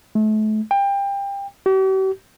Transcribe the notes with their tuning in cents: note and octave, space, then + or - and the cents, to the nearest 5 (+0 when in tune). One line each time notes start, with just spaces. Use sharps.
A3 -35
G5 +25
G4 -45